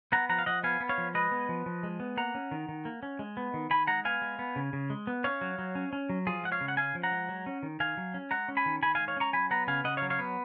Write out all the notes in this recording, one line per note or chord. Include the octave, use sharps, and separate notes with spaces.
B3 F#5 A#5
F3 F#5 A#5
F5
F3 D#5 F#5
B3 F5 G#5
B3
C#5 F5
F3
G#3 B4 D#5
B3
F3
F3
G#3
B3
A#3 F#5 A#5
C#4
D#3
D#3
A#3
C#4
G#3
B3
D#3
D#3 G#5 B5
G#3 F#5 A#5
B3 F5 G#5
G#3
B3
C#3
C#3
G#3
B3
C#4 C#5 F5
F#3
F#3
C#4
C#4
F#3
F3 F4 G#4
G#3 F#5
C#5 F5
C#3
F#5
C#4 F5 G#5
F3
F#5 A#5
G#3
F#3
C#4
D#3
D#3 F5 G#5
F#3
C#4
G#3 F#5 A#5
C#4
G#5 B5
D#3
D#3 G#5 B5
F5 G#5
G#3
C#5 F5
C#4 A#5 C#6
F#3 G#5 B5
B3 F#5 A#5
C#3 F5 G#5
C#3 D#5 F#5
C#5 F5
F#3
C#5 F5
B3